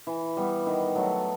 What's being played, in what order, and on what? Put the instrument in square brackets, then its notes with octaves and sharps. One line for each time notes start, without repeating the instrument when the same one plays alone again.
[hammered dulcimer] E3
G3 B3
D#3
F#3 A3